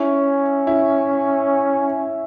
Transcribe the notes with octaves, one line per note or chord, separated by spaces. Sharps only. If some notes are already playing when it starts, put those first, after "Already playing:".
Already playing: C#4 E4
E4